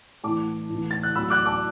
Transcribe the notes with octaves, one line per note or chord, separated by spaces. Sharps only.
A2 E3 A5 D6
A2 E3
A6
F#6
A2 F#3 B5 E6
D6 F#6
A5 D6